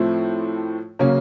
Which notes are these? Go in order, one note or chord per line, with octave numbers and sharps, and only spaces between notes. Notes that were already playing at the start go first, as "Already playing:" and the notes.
Already playing: A2 F3 A3 C4 E4
C#3 F#3 A#3 C#4